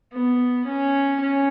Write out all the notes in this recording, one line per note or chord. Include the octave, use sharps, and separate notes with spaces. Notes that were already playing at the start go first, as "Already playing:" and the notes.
B3
C#4
C#4